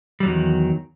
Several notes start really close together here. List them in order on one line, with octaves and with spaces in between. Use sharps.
G3 F#3 E2 D#3